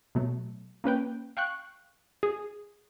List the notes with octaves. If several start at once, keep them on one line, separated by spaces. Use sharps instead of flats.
B2 F#3 A3
A#3 C#4 B4 G5
F5 G5 C#6 F#6
G#4